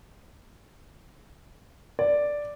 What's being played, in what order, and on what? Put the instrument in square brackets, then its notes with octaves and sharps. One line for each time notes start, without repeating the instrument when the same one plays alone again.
[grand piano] D5